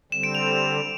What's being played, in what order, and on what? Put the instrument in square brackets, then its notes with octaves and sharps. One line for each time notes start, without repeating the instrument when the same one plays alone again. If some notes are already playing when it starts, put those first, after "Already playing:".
[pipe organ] D3 G3 C4 [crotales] E7
[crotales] D7
F7